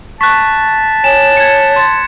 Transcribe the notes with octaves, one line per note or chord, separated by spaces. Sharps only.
A5 C#6 F#6 B6
C#5 G#5 E7
G#6 C#7
C6 A6